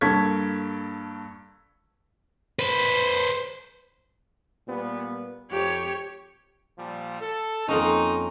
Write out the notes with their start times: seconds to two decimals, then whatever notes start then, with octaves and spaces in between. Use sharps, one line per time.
0.01 G2 A#3 A4 C#6 G#6 B6
2.59 B4 C5
4.68 A#2 G3 B3
5.51 F2 G4 C#5
6.78 A#2 F3 G3
7.21 A4
7.68 F2 A#3 C#4 D#4